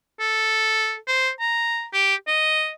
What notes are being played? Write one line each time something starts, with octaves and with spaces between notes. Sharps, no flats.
A4
C5
A#5
G4
D#5